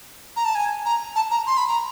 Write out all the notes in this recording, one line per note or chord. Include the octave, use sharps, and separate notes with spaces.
A#5
A5
G#5
A#5
A5
A#5
C6
B5
A#5